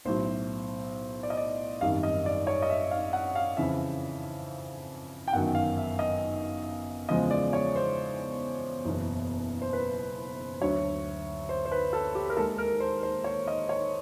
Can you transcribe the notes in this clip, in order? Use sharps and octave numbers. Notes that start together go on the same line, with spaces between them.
B1 A2 F#3 C5
D5
D#5
D5
G#1 F#2 D#3 G3 F5
D#5
D5
C#5
D#5
E5
F5
F#5
F5
F2 C#3 E3 E5
G5
G1 F#2 D#3 F#3 F#5
F5
E5
D#5
E2 C#3 F3 G#3 D#5
D5
C#5
C5
F#1 E2 B2
C5
B4
D2 D3 F#3 C#5
C5
C5
B4
A4
G4
A#4
D#2 D#3 G#3 A4
A#4
C5
C5
C#5
D#5
C#5